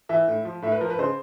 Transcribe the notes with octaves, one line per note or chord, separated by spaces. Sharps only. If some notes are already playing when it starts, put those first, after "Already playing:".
E3 E5
A2
F3
A2 E5
B4
F3 A#4
B4
C#3 C5